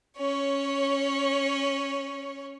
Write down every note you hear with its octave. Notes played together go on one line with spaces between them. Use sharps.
C#4 C#5